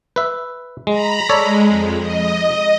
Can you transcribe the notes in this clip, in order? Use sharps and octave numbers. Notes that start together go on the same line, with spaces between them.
B4 E5
G#3 A#5 B5
G#3 A4 C#5 D5
F2
D#5